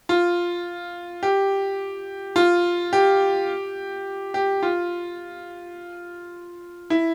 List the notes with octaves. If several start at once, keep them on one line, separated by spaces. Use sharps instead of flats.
F4
G4
F4
G4
G4
F4
E4